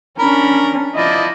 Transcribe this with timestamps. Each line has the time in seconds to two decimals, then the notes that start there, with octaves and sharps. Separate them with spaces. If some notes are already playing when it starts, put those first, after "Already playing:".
0.19 C#4 D4 A#4 B5
0.96 F3 E4 D5 D#5